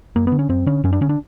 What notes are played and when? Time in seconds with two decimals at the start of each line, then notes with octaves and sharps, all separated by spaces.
0.16 F#2 A#3
0.27 D3 B3
0.39 C#4
0.49 F#2 C4
0.66 D3 C#4
0.84 F#2 C#4
0.93 D4
1.01 D3 C#4
1.09 D4